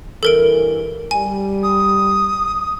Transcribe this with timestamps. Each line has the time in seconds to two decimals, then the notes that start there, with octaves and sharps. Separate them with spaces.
0.23 E2 G2 E3 A4 A#4 D7
1.11 G3 G#5
1.63 D#6